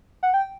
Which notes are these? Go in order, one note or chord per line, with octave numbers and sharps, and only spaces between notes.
F#5
G5